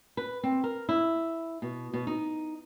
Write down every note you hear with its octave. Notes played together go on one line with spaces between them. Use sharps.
B4
C4
A#4
E4
B2
B2
D#4